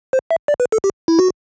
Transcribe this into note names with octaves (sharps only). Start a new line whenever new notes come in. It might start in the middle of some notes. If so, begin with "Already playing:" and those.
C5
E5
D5
B4
A4
G4
E4
F#4